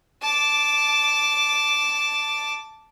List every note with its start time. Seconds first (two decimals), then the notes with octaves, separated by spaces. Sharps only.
0.22 A5 D6